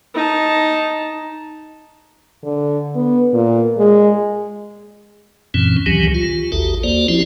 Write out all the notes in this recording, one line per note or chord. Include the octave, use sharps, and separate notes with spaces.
D#4 A5
D3
B3
A#2
G#3
F#2 A#2 E3 C4 C#4
C#2 D#3 E3 F#3 G4
F4
A1 D#2 F#4 G4 A4
A#3 F#4 C5 D5
F3 C4 C#4 E4 F#4 G4